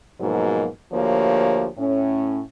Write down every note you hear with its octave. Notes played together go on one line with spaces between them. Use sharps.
G#2 B2 F3 F#3 A#3
D2 F3 A#3 G4 C#5
A2 C#4